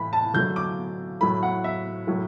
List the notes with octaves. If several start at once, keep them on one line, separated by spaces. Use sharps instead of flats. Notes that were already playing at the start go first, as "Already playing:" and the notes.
Already playing: A2 E3 A3 B5
A5
D3 F#3 A3 G6
D6
A2 F#3 A3 B5
F#5
E5
A2 F#3 A3